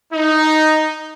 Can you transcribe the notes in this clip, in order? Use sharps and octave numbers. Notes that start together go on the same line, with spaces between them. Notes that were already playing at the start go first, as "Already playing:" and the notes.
D#4